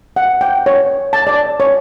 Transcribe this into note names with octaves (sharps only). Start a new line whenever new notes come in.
F#5
G5
C#5
A5
D5
C#5